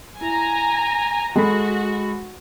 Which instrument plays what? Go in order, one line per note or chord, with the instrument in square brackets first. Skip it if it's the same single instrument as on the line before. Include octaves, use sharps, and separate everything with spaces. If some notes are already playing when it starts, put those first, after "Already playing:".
[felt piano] E4 [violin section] G#5 A#5
[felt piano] G#3 A4 B5 [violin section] F#4